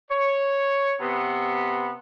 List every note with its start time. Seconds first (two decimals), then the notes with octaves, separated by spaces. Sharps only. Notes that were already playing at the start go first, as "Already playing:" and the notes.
0.11 C#5
1.01 C3 B3